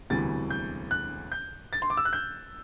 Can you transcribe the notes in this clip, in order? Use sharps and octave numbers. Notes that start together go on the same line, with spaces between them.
E1 D2 C3 E3 G3 A6
G6
F#6
G6
A6
C6
D6
E6
F#6
G6